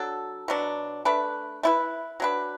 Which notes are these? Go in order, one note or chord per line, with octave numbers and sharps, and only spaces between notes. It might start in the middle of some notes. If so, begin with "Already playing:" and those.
Already playing: F#3 D4 A4
B2 F#3 D4
A3 D4 B4
A3 E4 B4
F#3 D4 B4